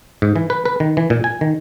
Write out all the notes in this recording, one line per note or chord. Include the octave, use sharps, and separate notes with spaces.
G#2
E3
B4
B4
D#3
E3
A#2
G#5
D#3